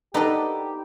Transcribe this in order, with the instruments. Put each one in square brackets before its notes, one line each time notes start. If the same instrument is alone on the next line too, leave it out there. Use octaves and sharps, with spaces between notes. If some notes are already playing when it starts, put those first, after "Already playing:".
[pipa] B3 D4 A4 [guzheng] D#4 B4 [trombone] G4